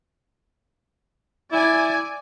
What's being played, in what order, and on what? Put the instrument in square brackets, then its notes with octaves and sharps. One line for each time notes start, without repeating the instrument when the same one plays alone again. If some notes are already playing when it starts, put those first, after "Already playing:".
[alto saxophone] E4 [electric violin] D5 G#5